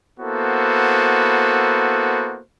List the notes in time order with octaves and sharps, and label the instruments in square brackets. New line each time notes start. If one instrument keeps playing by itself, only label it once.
[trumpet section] A#3 B3 E4 F#4 A4 C5